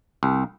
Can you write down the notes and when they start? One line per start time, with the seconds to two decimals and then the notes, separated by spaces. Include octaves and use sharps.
0.23 C2